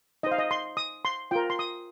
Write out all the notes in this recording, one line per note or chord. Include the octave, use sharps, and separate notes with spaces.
D#4 C5 D#5
F5
D#5
C6
D#6
C6
F4 A#4 G5
C6
D#6